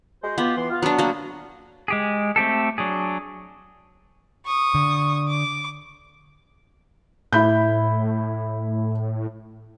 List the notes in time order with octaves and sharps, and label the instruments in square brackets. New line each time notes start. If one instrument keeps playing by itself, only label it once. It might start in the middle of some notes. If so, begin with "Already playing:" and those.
[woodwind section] G#3 F#4 C5
[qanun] B3 [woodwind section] F4 G4
[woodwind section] E3 C6
F4 F5
[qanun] F#3 D4 [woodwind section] B3
[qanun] A#3 F#4
[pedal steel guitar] G#3 G4 G#4
A3 C4 G4 A4
F#3 D4 G#4
[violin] C#6 D#6
[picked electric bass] D3
[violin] D6
[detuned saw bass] A2 [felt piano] E4 B5 G6